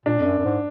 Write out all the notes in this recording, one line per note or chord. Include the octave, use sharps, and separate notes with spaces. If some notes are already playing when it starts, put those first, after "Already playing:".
A#2 D4
F2
F#2
F#2
G#2